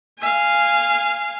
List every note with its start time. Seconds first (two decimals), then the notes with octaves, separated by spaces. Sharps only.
0.19 F5 G#5